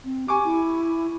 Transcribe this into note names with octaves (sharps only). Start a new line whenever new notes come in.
C4
G4 G#5 C#6 D6
E4